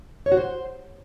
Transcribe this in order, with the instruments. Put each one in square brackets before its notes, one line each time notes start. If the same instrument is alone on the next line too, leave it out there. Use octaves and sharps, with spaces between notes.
[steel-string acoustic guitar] C#5
F#4
C5